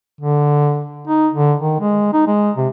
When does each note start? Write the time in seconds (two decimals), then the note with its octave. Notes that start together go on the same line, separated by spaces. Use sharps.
0.21 D3
1.07 D#4
1.33 D3
1.60 D#3
1.80 G#3
2.13 D#4
2.27 G#3
2.57 C3